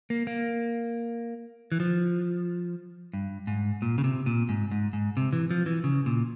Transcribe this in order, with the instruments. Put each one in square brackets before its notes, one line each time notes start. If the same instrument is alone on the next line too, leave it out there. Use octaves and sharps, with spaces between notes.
[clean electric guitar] A#3
A#3
E3
F3
G2
G#2
A#2
C#3
C3
A#2
G#2
G#2
G#2
C3
E3
F3
E3
C#3
A#2